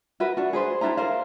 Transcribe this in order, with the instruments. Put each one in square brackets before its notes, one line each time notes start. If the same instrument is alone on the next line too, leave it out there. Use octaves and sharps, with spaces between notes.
[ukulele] F#4 A#4 B4 E5
D4 F#4
G#4 B4 C5
D4 E4 G4 A#5
A#4 C5 F5